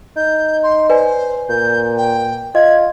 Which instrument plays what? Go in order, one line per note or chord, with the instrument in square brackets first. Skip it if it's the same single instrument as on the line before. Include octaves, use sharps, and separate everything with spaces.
[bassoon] D#4 [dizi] G6
[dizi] C6
[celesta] B4 D5 G#5 [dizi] C5
[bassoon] A#2 [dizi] G6
[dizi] G5
[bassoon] F4 [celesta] D#5 [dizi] G#6